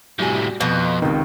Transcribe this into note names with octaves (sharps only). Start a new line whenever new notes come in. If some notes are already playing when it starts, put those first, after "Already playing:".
A2 C3 G3 F#4 G#5
F2 B2
C#2 C3 D#3 C4